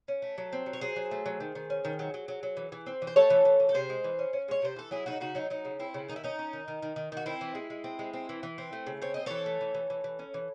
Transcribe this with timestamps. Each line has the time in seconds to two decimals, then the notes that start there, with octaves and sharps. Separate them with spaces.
0.08 C#4
0.22 A3
0.38 F#3
0.52 C4
0.66 F#3
0.73 C#5
0.81 F#3 G#4 C5
0.96 F#3
1.11 A3
1.26 F#3
1.40 D#3
1.55 D#3
1.70 C#4
1.85 D#3
1.99 F#3
2.14 F#3
2.28 F#3
2.43 F#3
2.57 E3
2.72 E3
2.86 C4
3.02 E3
3.07 C5
3.16 A3 A4 C#5
3.30 E3
3.45 E3
3.60 E3
3.69 A4
3.74 C3 G#4 C5
3.90 G#3
4.04 E3
4.19 C#4
4.33 C#4
4.48 G#3 C#5
4.62 C3 C5
4.76 E3 A4
4.91 F#3 E4 G#4
5.06 C#3 D#4 F#4
5.20 C#3 D#4 F#4
5.35 F#3 D#4
5.50 F#3 D#4
5.65 C#3
5.80 C4 E4
5.94 C#3
6.08 D#3 D#4
6.16 E4
6.24 C#4 D#4
6.39 C#4
6.53 D#3
6.68 D#3
6.82 D#3
6.96 D#3
7.12 D#3 F#4
7.26 C4 E4
7.41 E3
7.55 G#3
7.70 G#3
7.84 C4
7.99 G#3
8.13 C4
8.29 E3
8.43 E3
8.58 C4
8.73 A3
8.87 C#3
9.02 C4 C#5
9.14 C4 D#5
9.26 E3 A4 C#5
9.46 A3
9.61 E3
9.74 E3
9.90 E3
10.04 E3
10.19 C#4
10.34 E3